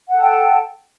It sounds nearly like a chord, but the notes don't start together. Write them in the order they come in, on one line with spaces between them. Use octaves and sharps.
F#5 A4 A5 G5